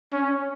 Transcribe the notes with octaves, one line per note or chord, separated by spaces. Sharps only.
C#4